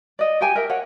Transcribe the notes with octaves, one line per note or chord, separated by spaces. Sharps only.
D5 D#5
G4 G5 G#5
A#4 E5
C#5 F#5